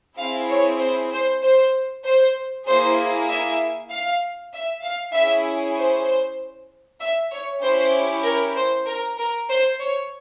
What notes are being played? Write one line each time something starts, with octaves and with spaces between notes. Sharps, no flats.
C4 E4 G#4 F5
C#5
C5
C5
C5
C5
A#3 E4 G#4 C5
E5
F5
E5
F5
C#4 E4 G#4 E5
C5
E5
C#5
C#4 E4 G4 C5
A#4
C5
A#4
A#4
C5
C#5